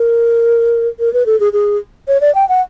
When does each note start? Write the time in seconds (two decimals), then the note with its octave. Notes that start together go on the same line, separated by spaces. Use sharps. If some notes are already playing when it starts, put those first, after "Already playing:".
Already playing: A#4
1.00 A#4
1.13 B4
1.26 A4
1.40 G#4
1.53 G#4
2.08 C#5
2.21 D5
2.35 G5
2.49 F#5